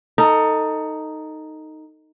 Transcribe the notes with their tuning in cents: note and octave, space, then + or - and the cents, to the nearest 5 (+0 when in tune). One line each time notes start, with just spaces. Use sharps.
D#4 +0 A4 +25